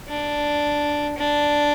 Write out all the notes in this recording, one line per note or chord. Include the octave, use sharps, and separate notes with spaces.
D4
D4